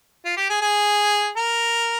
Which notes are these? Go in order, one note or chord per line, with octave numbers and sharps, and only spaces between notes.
F4
G4
G#4
G#4
A#4